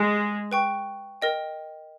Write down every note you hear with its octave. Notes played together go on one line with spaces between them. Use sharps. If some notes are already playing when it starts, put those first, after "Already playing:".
Already playing: G#3
B4 G5 C#6
A#4 D#5 G5